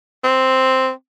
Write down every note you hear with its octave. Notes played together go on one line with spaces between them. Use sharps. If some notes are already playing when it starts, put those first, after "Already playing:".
C4